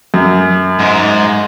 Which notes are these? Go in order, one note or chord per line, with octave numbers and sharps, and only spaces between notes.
F#2
G#2